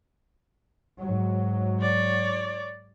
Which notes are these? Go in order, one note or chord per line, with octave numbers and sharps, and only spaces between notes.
G#2 F#3
C#5 D5